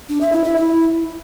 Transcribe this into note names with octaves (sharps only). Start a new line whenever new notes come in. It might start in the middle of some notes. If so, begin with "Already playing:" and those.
D4
E5
E4
E5
E4